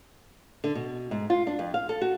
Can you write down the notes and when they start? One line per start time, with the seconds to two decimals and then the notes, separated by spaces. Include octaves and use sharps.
0.64 D3
0.75 B2
1.11 G#2
1.30 F4
1.47 D4
1.59 F2
1.74 F5
1.89 A4
2.01 F#4